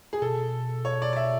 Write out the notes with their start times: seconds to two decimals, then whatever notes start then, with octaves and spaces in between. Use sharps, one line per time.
0.13 G#4
0.22 B2 A4
0.85 C#5
1.02 D5
1.13 D5
1.16 E5